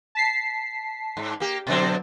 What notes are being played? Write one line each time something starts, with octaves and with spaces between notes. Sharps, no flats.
A5 B6 C7
G#2
A#3 G4
B2 D3 F#3 C4 A6